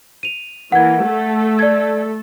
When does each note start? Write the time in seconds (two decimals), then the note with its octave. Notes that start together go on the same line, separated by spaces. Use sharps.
0.23 D#7 F7
0.72 E3 A#3 F#5 G#6
1.03 A3 A4
1.59 D5 G#6